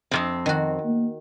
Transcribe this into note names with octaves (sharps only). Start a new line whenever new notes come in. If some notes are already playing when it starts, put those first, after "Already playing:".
F2 A#2 C4
D#3 F#4
A#3